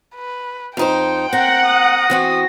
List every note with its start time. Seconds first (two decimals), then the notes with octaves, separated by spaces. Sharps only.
0.16 B4
0.77 F2 D#4 C5 G5
1.33 C4 A#4 F#5 A#6
1.66 D#6
2.10 E3 C4 F#4